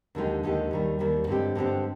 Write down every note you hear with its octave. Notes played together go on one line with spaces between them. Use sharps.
D#2 D3 G#3 D#4 G4
D#2 D3 G#3 D#4 G4
D#2 D#3 G3
D#2 D#3 G3
G2 D3 G#3 C4 G4
G2 D3 G#3 C4 G4